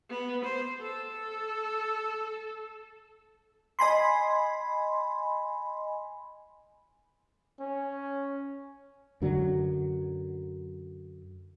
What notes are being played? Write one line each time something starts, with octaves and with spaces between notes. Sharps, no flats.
B3
C5
A4
D#5 G#5 B5 C6
C#4
F#2 D3 F#3